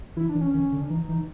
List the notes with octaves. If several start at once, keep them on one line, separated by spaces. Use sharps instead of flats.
E3 E4
D4
E3
C#4
D#3 C#4
D3
D4
E3 D#4
E3